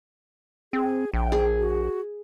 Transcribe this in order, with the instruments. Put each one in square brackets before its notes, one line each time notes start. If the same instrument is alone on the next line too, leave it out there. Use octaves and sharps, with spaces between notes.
[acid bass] C4 [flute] G#4
[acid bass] A#1 [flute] G5
[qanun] G#4
[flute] F#4